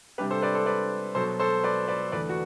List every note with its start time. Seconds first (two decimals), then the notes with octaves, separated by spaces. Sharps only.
0.18 C3 G3 D4 G4 B4
0.31 A4 C5
0.42 B4 D5
0.54 A4 C5
0.66 B4 D5
1.15 B2 F#3 B3 A4 C5
1.39 A4 C5
1.64 B4 D5
1.88 B4 D5
2.12 E2 D3 A3 B4 D5
2.29 F#4